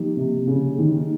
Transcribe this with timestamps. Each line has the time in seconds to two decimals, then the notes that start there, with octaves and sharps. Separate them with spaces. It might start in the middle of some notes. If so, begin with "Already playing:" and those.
Already playing: F3 A#3 D#4 G4
0.17 C3
0.47 C#3
0.79 D#3